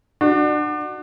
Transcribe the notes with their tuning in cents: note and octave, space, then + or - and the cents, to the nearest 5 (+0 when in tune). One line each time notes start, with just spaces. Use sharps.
D4 +35 F#4 +0